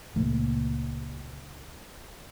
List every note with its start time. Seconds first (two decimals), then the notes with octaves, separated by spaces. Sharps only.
0.16 C#2 A#2 A3 A#3